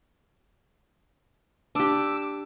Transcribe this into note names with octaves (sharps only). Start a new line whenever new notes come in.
D4 G4 D6 E6